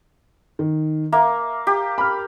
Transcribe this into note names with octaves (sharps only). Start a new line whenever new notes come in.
D#3
A#3 E5
G4
B5 F6